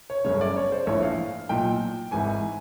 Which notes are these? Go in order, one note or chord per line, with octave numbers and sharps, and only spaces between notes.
C#5
G1 F#2 C#3 C#5
D5
C#5
C5
A#1 A2 E3 C#5
F5
B1 A#2 G5
G#1 G#2 E3 G#5